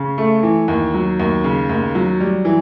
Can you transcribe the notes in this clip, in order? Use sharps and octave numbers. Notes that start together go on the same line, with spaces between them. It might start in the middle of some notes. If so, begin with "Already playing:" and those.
Already playing: C#3
A3
E3
D#2
F#3
D#2
C#3
D#2
F#3
G3
E3